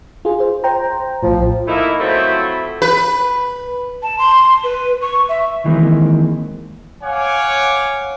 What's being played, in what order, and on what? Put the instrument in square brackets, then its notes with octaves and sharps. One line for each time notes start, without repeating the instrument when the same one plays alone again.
[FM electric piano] F4 G#4
C5
C5 G5 A#5
[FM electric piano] A#1 A2 [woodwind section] F3
[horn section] A3 A#3 D#4 E4
F3 F#3 A3 C4 E4
[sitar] B4
[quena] A5
C6
B4
C#6
E5
[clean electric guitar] D#3 E3 G#3 A#3 C4
[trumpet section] C#5 F5 F#5 G#5 D6